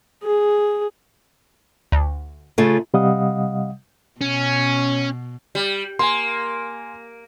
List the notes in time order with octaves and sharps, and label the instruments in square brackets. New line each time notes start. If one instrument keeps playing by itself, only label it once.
[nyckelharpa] G#4
[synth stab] D2
[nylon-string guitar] C#3 A3 F4
[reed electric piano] C3 G3 D#5 F5 F#5 D#6
[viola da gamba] B2 [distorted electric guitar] C#4
[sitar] G3
[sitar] A#3 [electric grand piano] G#5 C6